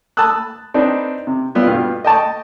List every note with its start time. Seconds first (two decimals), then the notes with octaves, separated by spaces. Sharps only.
0.17 A5 B5 D#6 E6 F#6
0.74 C4 D4 D#4 B4
1.27 C3
1.55 G3 B3 E4 F4
1.67 G2 B2 F4 F5 F6
2.05 D#5 G5 A5 C#6